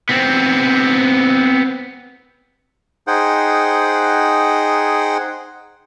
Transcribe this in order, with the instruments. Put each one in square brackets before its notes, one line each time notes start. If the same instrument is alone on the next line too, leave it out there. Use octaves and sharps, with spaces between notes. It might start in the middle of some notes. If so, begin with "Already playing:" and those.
[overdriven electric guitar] B3 C4
[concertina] D#4 G#4 C5 F#5 G5